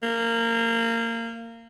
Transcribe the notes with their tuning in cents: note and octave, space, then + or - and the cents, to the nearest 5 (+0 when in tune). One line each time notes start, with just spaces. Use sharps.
A#3 -20